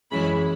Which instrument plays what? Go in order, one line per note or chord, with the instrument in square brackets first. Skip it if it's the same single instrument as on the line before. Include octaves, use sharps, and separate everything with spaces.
[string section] F#2 E3 G#3 C#4 E4 B5